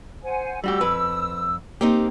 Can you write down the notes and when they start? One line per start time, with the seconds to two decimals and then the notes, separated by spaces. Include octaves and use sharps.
0.24 C5 F#5 G#5
0.64 G3 F#4 G4 E6
0.81 F2 B4
1.81 A#3 C4 D#4 G4